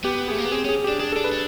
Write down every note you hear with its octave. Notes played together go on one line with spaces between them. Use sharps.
B3 G4
A3 G#4
A#3
B3
C4 G#4
C#4
G#4
D4 G4
D4 G#4
D4 A4
B4
D4